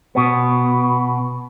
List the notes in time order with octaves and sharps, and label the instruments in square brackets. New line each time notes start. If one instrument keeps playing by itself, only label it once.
[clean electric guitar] B2 B3